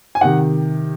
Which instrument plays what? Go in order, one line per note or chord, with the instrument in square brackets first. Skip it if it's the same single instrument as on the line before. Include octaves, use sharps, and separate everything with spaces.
[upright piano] G#5
[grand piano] C3 D#3 [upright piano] F#5